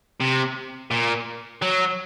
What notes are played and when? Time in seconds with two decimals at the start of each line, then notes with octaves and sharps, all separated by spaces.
0.20 C3
0.91 A#2
1.62 F#3